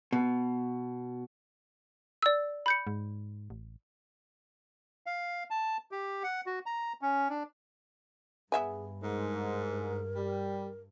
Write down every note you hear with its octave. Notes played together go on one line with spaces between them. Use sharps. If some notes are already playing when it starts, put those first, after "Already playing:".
B2
D5 E6
B5 G6 C#7
G#2
A1
F5
A5
G4
F#5
F#4
A#5
C#4
D4
G2 B3 G#4 E5 G#5
G#2 A#4
G3